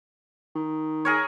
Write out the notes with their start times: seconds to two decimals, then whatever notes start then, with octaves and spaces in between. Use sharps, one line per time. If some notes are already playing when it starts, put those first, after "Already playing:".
0.56 D#3
1.05 G#4 A#4 C#5